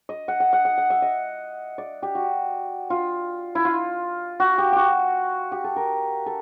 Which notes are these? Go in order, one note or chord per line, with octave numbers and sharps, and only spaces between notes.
D#5
F#5
F#5
F#5
F#5
F#5
E5
D#5
D5
G4
F#4
F4
E4
F4
F#4
G4
F#4 G4
G4
A4
A#4
A4